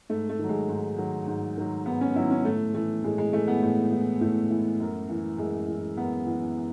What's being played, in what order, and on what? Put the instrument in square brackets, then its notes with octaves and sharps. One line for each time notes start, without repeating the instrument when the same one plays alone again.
[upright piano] G#2 A3
A3
D#3 F#3
G#3
G#2
D#3 F#3
G#2
D#3 F#3
G#2 B3
C#4
D#3 F#3 E4
C#4
A2 A3
E3 A3
A2 G#3
G#3
E3 A3
B3
A2
E3
A2 A3
E3
F#2
E3
F#2 G#3
E3
F#2 B3
E3